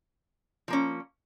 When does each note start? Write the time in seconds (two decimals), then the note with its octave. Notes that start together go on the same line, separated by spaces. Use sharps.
0.68 F3 A#3 C#4